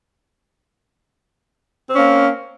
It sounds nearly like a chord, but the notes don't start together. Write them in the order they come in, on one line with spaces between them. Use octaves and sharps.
C4 C#4 A#3